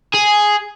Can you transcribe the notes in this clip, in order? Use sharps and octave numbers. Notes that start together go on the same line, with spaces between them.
G#4